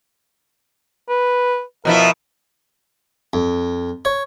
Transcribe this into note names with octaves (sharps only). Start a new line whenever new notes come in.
B4
B2 F3 E4 A#4
F2
C#5